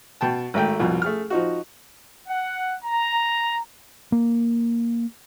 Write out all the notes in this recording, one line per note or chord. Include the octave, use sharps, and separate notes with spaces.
B2 G5 A5
G#1 A3 G5
C2 F2 B2
A3 G#4 F6
F3 D#4 F#4
F#5
A#5
A#3